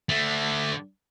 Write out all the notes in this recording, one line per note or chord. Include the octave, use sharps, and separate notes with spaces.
D3 A3